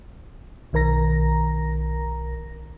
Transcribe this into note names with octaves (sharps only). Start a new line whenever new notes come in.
B1 D#3 A#4 A#5 A#6